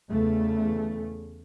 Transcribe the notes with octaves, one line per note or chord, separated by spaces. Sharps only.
E2 C#3 A3